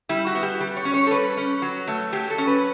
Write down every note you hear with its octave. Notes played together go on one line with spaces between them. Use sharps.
G3 E4
F#4
B3
G4
G3 G4
C#5
C#4
C#5
A4
G3 B4
C#4
F#3
A3
F#3 G4
A4
C#4
B4